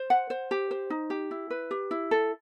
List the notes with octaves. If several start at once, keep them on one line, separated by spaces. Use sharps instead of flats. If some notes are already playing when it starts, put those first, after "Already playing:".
Already playing: C5
F#5
C5
G4
C5
D#4
G4
E4
B4
G4
E4
A4